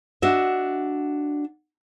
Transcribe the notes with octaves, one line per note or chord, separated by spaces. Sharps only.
D4 F#4 D#5 E5